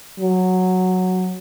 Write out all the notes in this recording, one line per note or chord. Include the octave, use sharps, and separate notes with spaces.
F#3